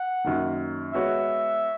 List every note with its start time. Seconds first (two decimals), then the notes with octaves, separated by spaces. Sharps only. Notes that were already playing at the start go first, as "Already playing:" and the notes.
Already playing: F#5
0.24 F#2 D#3 A#3
0.94 G#3 B3 F#4 C#5 E5